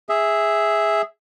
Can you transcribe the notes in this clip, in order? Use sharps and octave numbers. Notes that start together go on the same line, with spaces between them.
G#4 E5